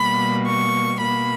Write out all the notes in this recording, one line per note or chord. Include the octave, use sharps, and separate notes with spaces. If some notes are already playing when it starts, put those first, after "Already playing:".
Already playing: B2 G3 A#3 B5
C#6
B2 A#3 B5